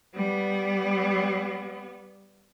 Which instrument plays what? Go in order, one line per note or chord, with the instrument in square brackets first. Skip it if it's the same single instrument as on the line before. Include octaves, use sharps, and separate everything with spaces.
[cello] G3 B3